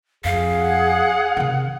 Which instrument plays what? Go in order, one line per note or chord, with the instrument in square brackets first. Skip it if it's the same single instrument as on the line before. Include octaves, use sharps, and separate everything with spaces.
[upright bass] F2 [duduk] G#4 [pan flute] F5
[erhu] F#5
[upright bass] C3 D#3